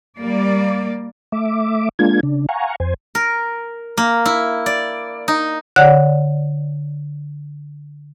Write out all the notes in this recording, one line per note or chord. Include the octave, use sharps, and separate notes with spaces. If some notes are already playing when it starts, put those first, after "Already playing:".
G3 A#3 D5
A3 E5 D6
G#3 A#3 D4 F4 G#6
C#3 D4
F5 F#5 G#5 A#5 C#6
F2 C5 G#5
A#4
A#3
E4
D5
D#4
D3 C#5 D5 F#5